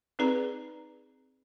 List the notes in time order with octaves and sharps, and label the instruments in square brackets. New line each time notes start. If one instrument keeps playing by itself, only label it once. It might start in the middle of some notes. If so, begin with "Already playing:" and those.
[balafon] C4 D#4 G#4 B4 D5 A#5